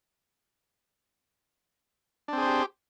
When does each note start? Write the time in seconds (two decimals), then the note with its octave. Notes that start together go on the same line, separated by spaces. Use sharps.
2.28 D4
2.33 C4
2.37 G#4
2.42 C5
2.47 G4